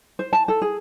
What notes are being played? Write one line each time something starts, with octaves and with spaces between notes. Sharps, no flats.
C5
A5
A4
G#4